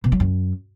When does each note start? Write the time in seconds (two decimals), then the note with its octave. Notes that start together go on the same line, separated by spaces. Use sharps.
0.04 B2
0.12 F#3
0.20 F#2